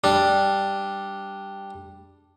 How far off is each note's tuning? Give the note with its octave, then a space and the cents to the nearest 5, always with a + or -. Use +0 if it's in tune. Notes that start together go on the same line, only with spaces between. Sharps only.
G3 +0 D4 +0